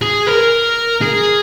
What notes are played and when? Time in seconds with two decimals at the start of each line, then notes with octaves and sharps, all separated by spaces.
0.01 G#4
0.27 A#4
1.02 G#4